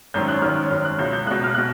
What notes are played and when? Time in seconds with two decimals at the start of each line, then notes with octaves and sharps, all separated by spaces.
0.14 G#1 F#2 D#3 G6
0.28 F#6
0.42 G#1 F#2 D#3 F6
0.70 G#1 F#2 D#3 F6
0.85 F#6
0.99 C#2 B2 G6
1.13 G6
1.27 C#2 B2 F#6
1.44 F6
1.55 B2 F#6